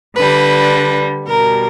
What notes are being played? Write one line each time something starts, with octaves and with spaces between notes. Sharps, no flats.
D3 G3 B4
B2 G3 A#4